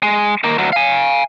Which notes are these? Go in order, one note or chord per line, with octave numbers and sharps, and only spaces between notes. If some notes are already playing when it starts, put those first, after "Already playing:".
G#3
D#3 A#3
D2 F#3
F5 G#5